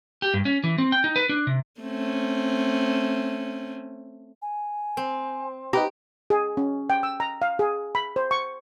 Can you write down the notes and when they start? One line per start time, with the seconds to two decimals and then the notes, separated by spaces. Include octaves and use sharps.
0.22 G4
0.34 G2
0.45 C#4
0.64 E3
0.78 C4
0.92 G5
1.04 D#4
1.16 B4
1.29 D4
1.47 C3
1.81 A3 C4 C#4
4.42 G#5
4.97 C4
5.73 D#4 G4 B4 A#5
6.30 G#4
6.57 C#4
6.90 G5
7.03 E6
7.20 A#5
7.42 F5
7.59 G#4
7.95 B5
8.16 C5
8.31 C#6